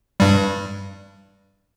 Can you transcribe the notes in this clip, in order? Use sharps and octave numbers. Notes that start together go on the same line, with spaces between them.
G2 G3